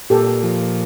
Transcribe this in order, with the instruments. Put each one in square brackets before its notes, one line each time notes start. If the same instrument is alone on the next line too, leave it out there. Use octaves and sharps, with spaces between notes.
[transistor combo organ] A#2 [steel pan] G4 A4
[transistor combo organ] F3